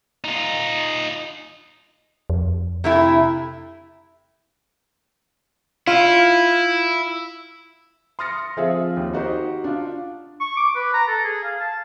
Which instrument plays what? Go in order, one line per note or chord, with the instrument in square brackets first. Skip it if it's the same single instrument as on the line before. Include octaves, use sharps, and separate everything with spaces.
[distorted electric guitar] D#4 F4
[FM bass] F2
[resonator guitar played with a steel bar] C3 A3 E4
[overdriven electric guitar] E4 [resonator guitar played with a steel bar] F4
[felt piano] C6 D#6 F6 A6 A#6 C#7
F3 C4 F4 G#4 E5
D#2
D#4 F#4 G4 C5
D4 F4
[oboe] C#6
D6
B4
A#5
A4
G#4
F5
A5